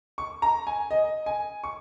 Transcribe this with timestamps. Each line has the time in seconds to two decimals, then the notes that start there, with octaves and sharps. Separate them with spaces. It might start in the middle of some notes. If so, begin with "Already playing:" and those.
0.18 C#6
0.42 A#5
0.67 G#5
0.91 D#5
1.26 G#5
1.64 C#6